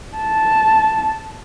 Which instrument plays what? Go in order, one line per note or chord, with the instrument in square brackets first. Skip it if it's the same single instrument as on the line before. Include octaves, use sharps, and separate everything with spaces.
[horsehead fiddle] A5